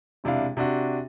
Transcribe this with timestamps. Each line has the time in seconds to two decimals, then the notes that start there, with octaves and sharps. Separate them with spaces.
0.24 E1 C3 D4 E4 F5
0.57 C3 D4 F#4